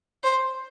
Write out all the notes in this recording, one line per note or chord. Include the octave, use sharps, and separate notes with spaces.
C5